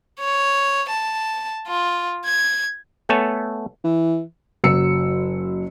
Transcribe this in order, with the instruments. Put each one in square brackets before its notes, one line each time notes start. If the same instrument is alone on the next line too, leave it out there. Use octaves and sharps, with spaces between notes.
[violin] C#5
A5
F4
G#6
[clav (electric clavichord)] A3 B3 A4 C#5 G#5 A5
[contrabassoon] E3
[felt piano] F#1 F#3 E6 C#7